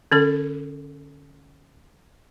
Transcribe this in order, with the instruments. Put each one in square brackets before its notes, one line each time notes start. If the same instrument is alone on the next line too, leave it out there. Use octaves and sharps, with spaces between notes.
[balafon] D3 C#4 A4